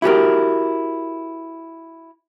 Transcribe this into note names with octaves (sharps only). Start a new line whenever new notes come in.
E4 F#4 G4 A#4